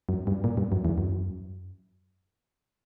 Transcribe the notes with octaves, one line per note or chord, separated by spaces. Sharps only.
F#2
G2
A#2
G2
F#2
E2
F#2